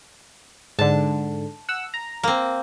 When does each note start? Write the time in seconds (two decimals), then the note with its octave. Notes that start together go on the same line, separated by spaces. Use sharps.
0.79 G#2 D3 A5
1.69 F#5 E6
1.94 A#5
2.23 A#3 C4